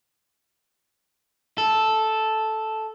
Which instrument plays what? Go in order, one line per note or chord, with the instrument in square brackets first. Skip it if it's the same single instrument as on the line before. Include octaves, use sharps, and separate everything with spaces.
[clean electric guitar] A4